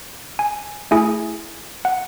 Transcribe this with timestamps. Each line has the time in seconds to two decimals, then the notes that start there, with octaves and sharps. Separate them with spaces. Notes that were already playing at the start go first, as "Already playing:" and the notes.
0.39 G#5
0.91 A3 E4 G#4 G#5
1.85 F#5